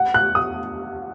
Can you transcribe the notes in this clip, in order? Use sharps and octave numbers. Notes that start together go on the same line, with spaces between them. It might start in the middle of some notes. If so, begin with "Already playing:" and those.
Already playing: F#5
F#6
D#6